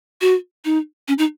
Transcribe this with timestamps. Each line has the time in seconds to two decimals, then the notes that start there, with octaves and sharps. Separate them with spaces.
0.21 F#4
0.65 D#4
1.08 C#4
1.18 D#4